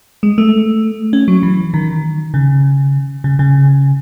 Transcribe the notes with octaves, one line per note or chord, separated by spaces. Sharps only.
G#3
A3
C#4
F#3
E3
D#3
C#3
C#3
C#3